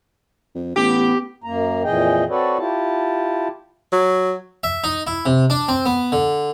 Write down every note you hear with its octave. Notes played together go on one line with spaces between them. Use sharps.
F2
A1 B3 G4
F#2 A#3 A#5
F2 A#2 E3 G#4 D#5 G5
C4 F#4 A4 B4 C#5 D5
E4 F4 G4 A5
F#3
E5
D#4
E4
C3
D4
C4
B3
D3